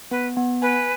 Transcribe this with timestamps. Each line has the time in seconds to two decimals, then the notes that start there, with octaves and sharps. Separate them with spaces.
0.11 B3 B4
0.37 B3
0.62 B4 G#5